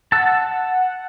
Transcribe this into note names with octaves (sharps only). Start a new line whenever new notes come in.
F#5 A5 E6